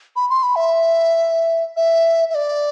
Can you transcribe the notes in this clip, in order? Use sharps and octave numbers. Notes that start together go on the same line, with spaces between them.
B5
C6
B5
E5
E5
E5
D5